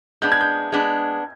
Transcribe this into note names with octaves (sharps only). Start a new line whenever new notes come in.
G#3 B3 D4 G6
G#6
G6
G#3 B3 D4